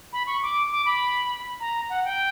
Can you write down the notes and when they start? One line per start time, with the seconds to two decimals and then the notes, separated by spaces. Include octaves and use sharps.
0.13 B5
0.27 C#6
0.42 D6
0.72 D6
0.86 B5
1.60 A#5
1.90 F#5
2.04 G5